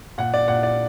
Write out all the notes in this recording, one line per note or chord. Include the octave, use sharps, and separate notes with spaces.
A#2 F#5
D5
A#2 F#5
D5